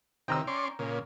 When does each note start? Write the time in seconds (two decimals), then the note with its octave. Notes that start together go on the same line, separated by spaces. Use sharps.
0.28 C3 D#3 G5 A#5 E6
0.47 C#4 D5 C6
0.79 A#2 C#3